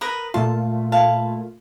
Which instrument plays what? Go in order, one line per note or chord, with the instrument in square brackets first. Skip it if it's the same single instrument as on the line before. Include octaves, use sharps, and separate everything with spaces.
[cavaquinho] A#4 B4 D#6
[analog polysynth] A#2 A3 F4 [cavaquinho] A5
[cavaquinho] E4 F5 A5